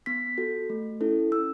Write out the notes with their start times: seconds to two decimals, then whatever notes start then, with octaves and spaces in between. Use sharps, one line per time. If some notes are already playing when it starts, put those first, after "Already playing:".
0.06 B3 B6
0.38 F#4 A4
0.70 A3
1.01 C#4 E4 A4
1.32 C#4 E6